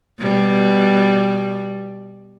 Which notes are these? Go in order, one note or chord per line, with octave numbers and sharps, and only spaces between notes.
B2 G3